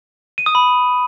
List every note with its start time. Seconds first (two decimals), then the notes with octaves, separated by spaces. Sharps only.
0.38 D#7
0.46 D#6
0.55 B5